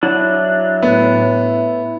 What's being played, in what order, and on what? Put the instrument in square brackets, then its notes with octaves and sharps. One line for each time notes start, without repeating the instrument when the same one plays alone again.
[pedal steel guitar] F#3 D4 [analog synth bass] E4
[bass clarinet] A2 [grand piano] A3 B3